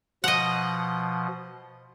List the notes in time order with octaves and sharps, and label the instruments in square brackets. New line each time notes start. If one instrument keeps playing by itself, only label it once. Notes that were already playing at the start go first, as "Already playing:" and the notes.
[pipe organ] B2 F3 [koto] D#5 F#5